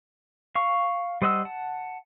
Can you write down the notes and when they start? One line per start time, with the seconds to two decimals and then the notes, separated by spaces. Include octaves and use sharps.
0.55 F5 C#6
1.22 G3 C5 D#5 F#5 E6
1.45 F#5 A5